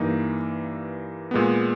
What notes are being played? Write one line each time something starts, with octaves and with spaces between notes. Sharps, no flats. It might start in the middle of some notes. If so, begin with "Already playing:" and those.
Already playing: G2 E3 A#3 D#4
A#2 G#3 B3